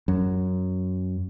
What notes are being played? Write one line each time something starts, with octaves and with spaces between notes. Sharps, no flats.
F#2